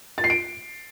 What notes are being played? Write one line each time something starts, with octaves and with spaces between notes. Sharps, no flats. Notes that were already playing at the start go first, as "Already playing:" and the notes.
A6
C7
D7